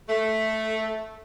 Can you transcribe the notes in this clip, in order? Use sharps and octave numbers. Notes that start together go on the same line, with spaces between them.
A3